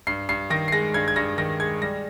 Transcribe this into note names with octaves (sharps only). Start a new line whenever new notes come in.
G2 C7
G2 C7
D#3 A#6
C7
G#3 A#6
G2 G#6
G#6
G2 A#6
D#3 A#6
G#3 G#6
G3 A#6